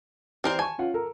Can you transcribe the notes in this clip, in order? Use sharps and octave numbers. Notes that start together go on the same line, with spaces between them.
E3 C4 G4 A#4 C5 D5
G#5 A5 C#6
C#4 F4 F#5
A4 A#4 A#5